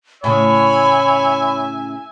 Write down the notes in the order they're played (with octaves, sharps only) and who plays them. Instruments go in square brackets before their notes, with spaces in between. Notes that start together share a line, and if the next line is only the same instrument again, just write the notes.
[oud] A2 C#3 [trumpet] C#5 [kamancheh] E5 G#5 [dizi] B5